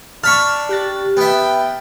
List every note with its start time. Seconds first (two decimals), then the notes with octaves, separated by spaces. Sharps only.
0.24 D4 A5 B5 C#6 F6
0.69 G4 F#6 A6
1.17 B3 E5 G5